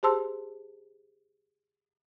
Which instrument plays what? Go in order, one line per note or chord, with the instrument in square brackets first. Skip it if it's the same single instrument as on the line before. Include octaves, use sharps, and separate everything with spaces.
[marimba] G4 G#4 C5 A5 C6 E6